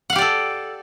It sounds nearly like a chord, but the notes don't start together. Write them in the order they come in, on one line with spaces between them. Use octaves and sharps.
F#5 F5 G4 D5 A4